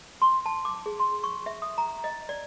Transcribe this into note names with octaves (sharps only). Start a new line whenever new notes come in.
C6
A5
D6
G#4
C6
C#6
E5
D#6
A#5
D#5
D5